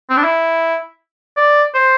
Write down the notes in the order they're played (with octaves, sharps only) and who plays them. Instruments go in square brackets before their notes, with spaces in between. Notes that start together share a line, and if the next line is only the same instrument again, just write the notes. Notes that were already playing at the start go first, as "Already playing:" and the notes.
[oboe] C4
D4
E4
D5
C5